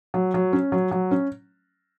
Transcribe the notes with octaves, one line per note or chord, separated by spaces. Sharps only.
F#3
F#3
C#4
F#3
F#3
C#4